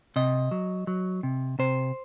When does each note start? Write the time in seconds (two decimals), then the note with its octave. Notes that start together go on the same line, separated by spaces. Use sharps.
0.16 C3 D#5
0.51 F#3
0.87 F#3
1.23 C3
1.59 C3 C5